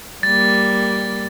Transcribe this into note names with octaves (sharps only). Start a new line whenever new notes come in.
G3 A#3 A6